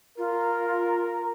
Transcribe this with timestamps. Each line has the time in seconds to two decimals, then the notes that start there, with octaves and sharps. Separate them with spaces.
0.18 F4 A#4